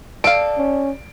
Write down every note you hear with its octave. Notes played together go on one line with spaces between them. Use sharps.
A4 D5 F5 D7
C#4